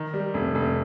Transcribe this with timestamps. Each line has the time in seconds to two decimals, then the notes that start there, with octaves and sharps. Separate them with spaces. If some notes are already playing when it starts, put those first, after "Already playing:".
Already playing: D#3
0.13 G3
0.34 F1
0.55 F1